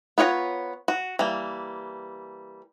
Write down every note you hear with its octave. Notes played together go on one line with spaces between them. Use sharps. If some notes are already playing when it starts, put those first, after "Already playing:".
B3 F4 C#5 F#5 A#5
F#4
E3 G3 A#3